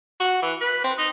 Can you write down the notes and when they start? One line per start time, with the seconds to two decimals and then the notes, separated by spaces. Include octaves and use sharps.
0.20 F#4
0.42 E3
0.61 B4
0.84 C4
0.98 D#4